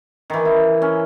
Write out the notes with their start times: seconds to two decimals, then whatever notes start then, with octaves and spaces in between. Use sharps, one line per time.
0.30 D#3 E3
0.45 E4
0.82 C#4